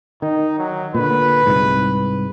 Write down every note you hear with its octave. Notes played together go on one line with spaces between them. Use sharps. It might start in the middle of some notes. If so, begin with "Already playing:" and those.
D#3 D#4
F#3
A#2 D3 B4
C2 G#2